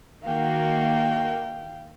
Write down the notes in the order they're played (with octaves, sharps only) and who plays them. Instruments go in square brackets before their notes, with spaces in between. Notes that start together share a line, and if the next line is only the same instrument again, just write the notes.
[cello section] D#3 A#3 F#4 [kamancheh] F5 G5